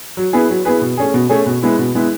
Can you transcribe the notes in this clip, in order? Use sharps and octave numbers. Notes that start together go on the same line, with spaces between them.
F#3
B3 E4 G#4 B4
F#3
B3 E4 G#4 B4
B2
A3 C#4 G#4
B2
A3 C#4 G#4
B2
G#3 B3 E4
B2
G#3 B3 E4